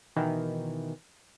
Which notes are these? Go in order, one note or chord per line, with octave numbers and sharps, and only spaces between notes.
B2 D#3 E3